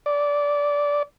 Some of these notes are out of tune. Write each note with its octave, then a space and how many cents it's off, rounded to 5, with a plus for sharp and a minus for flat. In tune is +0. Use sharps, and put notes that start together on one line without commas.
D5 -15